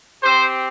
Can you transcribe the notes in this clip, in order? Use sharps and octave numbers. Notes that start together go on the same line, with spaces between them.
C4 G4 C5